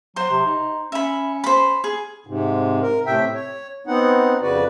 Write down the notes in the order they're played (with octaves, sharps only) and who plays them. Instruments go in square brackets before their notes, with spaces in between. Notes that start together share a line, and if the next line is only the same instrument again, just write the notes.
[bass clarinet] F#3 [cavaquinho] C5 C6
[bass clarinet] C3
D#4
[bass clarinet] C#4 [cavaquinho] E5 B5
[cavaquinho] C5 B5
G#4
[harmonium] G#2 C3
A#4
A2 C3 E5 G5
C#5
B3 C4 D#4 F#5
F2 C#3 F#4 B4 D5